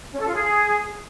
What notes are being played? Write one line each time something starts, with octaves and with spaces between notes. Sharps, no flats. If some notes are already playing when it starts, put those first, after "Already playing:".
C#4
A4
F4
G#4